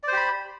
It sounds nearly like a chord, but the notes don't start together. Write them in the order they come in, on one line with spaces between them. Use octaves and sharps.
D5 C5 G4 B5